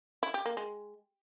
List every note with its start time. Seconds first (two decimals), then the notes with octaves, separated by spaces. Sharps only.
0.23 E4
0.34 G4
0.46 A#3
0.57 G#3